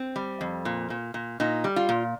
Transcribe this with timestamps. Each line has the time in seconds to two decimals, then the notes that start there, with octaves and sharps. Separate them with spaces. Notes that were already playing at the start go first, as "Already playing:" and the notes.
Already playing: C4
0.16 G3
0.41 F2
0.65 A#2
0.90 A#2
1.14 A#2
1.40 A#2 D#4
1.64 G3
1.76 F4
1.89 A#2